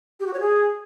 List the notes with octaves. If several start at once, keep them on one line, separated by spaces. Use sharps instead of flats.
G4
F#4
C#5
G#4